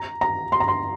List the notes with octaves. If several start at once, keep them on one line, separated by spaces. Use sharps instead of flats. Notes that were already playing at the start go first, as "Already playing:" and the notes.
Already playing: A#5
A#5
C6
A#5
C6